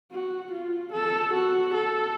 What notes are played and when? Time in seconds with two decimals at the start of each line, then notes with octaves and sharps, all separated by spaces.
0.12 F#4
0.51 F4
0.92 A4
1.33 F#4
1.74 A4